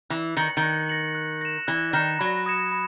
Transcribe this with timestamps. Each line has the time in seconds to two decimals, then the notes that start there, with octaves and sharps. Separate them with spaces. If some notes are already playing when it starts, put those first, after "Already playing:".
0.10 E3 F#6
0.37 D#3 A#6 C#7 F#7
0.57 D#3
0.63 F#6
0.89 A#6 C#7 F#7
1.15 F#6
1.41 A#6 E7
1.67 E3 F#6
1.93 D#3 A#6 E7
2.19 F#3 B5
2.46 D#6 G#6 C#7 E7
2.72 B5